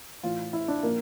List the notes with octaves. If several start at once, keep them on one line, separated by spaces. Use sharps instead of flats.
A2 E3 F4
E4
D4
A#2 F3 A#3